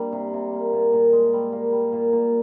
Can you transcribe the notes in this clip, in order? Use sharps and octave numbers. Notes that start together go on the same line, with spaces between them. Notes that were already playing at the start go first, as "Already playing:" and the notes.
Already playing: G3 A#3 D4
C3
C3
A#3
A#2
A#2
G#3
G3
A#3
G3
A#2
A#2